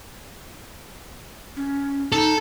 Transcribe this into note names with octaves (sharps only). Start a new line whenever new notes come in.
C#4
D#4 A4